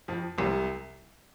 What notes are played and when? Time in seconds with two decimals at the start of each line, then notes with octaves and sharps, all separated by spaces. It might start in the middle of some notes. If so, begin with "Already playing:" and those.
0.08 F2 F3
0.38 C2 C3